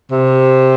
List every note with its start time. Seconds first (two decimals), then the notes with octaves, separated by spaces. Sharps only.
0.11 C3